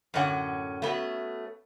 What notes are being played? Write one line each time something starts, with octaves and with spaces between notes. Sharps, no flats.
F#2 A2 D3 C#4 F#5
A3 B3 C#4 F#4